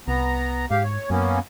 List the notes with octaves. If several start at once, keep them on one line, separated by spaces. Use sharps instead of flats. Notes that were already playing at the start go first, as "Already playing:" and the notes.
C2 B3 A#5
G#2 G4 F5
C#5
F#2 A#3 B3 C#4